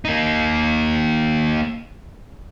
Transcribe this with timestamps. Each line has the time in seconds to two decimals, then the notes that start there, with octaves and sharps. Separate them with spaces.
0.05 A#3 D#4